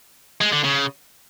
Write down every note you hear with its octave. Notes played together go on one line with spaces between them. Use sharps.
G#3
D3
C#3